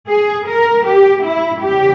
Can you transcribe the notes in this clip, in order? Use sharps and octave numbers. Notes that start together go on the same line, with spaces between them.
G#4
A#4
G4
E4
E2 C#3 G3 G4